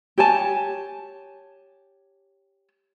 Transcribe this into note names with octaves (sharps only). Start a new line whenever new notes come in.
G4 C#5 G#5 A5